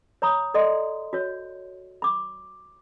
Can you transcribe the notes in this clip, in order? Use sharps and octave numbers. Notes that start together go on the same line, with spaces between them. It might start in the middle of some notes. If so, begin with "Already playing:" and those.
C#5 A#5 B5 D#6
A4 D5 D#5 C6
F#4 C#5
B5 D6